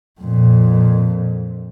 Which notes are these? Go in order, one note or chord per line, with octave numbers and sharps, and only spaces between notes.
F2 A#2